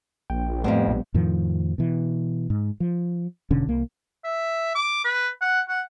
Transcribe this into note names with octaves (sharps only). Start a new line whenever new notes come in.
A#1 G5
F2 A2 G3 B3 C4
A#1
F2 A2 D#3 F3
B2 E3
G#2
F3
E1 B2 D3 C#4
C2 A#3
E5
D6
B4
F#5
F#5